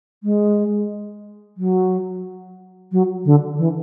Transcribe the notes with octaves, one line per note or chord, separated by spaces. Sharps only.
G#3
F#3
F#3
D3
E3